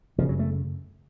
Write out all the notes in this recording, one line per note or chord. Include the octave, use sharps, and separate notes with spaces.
F#2 C#3 F3
F#3
A3